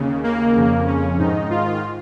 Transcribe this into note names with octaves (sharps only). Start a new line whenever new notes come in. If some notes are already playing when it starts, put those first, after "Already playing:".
Already playing: D#2 C#3
A#3
F2 C#3
C#4
G#2 D#3 D#4
F4